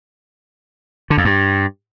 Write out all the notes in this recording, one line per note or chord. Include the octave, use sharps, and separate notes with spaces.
D3
F2
G2